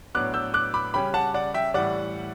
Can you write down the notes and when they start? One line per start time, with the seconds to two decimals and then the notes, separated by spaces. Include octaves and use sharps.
0.15 A2 F#3 B3 D4 D6 F#6
0.34 E6 G6
0.54 D6 F#6
0.74 B5 D6
0.94 C#3 G3 C#4 G5 B5
1.14 F#5 A5
1.34 D5 F#5
1.54 E5 G5
1.74 A2 E3 G3 D5 F#5